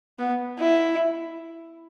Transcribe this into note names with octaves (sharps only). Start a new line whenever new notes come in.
B3
E4